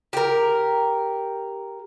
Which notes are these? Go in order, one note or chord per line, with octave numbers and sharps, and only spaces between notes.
G4 A#4